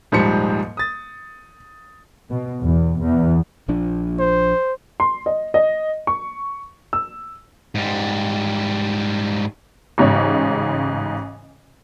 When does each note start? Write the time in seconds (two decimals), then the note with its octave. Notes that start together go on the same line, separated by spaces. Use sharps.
0.12 D#1 G#2 F3 G3 C5 C#7
0.77 D#6 A6
2.29 B2
2.61 E2
3.00 E2
3.68 A#1 F3 D4
4.19 C5
5.00 C6
5.26 D#5
5.54 D#5
6.07 C#6
6.93 E6
7.75 G#2 G3
9.98 A1 G#2 C#3 C#5